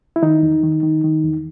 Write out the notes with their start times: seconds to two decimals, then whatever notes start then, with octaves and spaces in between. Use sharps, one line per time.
0.16 E4
0.22 D#3 D#4
0.43 E2
0.63 D#3
0.83 D#3
1.04 D#3
1.24 E2